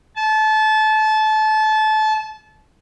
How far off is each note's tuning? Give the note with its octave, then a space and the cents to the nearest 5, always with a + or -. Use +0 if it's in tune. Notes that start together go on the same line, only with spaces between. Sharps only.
A5 -25